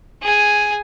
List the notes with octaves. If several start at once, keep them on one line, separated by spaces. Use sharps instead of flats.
G#4 G#5